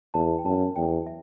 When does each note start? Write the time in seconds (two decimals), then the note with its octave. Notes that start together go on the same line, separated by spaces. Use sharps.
0.14 E2 A5
0.39 G5
0.45 F#2 A5
0.76 E2 G5
1.06 E5